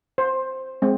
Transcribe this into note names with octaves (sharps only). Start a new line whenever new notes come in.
C5
G#3 C4